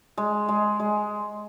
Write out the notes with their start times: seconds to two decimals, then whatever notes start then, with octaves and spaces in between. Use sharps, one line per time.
0.17 G#3
0.49 G#3
0.80 G#3